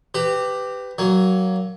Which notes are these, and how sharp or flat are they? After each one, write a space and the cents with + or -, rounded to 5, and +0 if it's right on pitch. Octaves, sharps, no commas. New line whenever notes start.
G4 +0 B4 +20 A#5 -25
F#3 +15 A#3 +0 G#5 +15